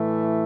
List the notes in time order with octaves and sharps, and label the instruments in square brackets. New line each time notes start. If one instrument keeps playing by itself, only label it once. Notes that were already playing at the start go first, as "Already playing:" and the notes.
Already playing: [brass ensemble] A2 E3 A3